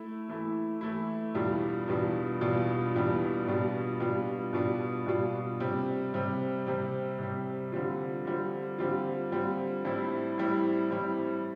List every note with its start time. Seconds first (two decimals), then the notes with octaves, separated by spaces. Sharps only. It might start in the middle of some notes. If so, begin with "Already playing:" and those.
Already playing: A3 E4
0.29 E3 A3 E4
0.81 E3 A3 E4
1.34 E2 B2 G3 D4 F4
1.87 E2 B2 G3 D4 F4
2.41 E2 B2 G3 D4 F4
2.94 E2 B2 G3 D4 F4
3.47 B2 G3 D4 F4
4.00 B2 G3 D4 F4
4.53 B2 G3 D4 F4
5.06 B2 G3 D4 F4
5.60 C3 G3 C4
6.13 C3 G3 C4
6.67 C3 G3 C4
7.18 C3 G3 C4
7.72 D3 G3 C4 F4
8.25 D3 G3 C4 F4
8.78 D3 G3 C4 F4
9.31 D3 G3 C4 F4
9.85 A2 G3 C4 E4
10.38 A2 G3 C4 E4
10.90 A2 G3 C4 E4